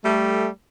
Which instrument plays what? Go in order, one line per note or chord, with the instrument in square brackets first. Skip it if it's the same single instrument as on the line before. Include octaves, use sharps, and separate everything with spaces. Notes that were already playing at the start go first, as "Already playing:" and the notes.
[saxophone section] G3 A3